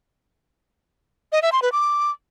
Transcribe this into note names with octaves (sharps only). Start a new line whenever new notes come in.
D#5
E5
C6
B4
D6